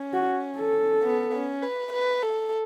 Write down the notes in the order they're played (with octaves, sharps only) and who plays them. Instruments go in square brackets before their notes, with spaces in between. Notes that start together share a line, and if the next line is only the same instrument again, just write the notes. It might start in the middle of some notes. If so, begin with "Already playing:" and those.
Already playing: [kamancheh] C#4
[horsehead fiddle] F#4
A4
[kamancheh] B3
C#4
B4
B4
A4